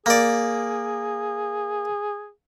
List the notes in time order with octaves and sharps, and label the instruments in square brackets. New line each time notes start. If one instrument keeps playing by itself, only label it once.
[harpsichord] A#3 D5 [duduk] G#4